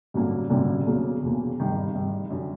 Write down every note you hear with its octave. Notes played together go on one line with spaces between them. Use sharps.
A1 G2 D3 F#3 A#3
A1 G2 D3 F#3 A#3
E1 E2 C#3 F#3 A#3
E1 E2 C#3 F#3 A#3
G#1 G2 D#3 G3
G#1 G2 D#3 G3
F#2 D3 G3